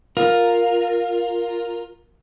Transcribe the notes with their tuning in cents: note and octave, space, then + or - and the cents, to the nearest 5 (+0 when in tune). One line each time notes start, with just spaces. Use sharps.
F4 +10 A#4 +0